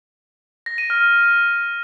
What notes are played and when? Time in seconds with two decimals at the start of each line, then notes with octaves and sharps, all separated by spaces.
0.66 A#6
0.78 D#7
0.90 F6